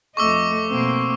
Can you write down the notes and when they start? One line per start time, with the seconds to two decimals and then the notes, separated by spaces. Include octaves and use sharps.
0.17 F2 A3 D#5 C#6 D6 E6
0.68 B2 A#3 C4